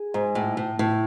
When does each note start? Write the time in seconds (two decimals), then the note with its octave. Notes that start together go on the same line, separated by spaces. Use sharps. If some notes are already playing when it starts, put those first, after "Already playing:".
Already playing: G#4
0.14 G#2
0.35 A2
0.57 A2
0.79 A2